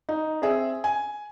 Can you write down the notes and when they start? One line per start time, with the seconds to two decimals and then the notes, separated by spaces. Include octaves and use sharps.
0.09 D#4
0.42 C4 G#4 E5
0.84 G#5